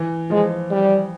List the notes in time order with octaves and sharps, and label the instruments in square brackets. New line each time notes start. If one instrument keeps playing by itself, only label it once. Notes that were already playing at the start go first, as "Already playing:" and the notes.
Already playing: [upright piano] E3
[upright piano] F3 [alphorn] G#3
[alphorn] G3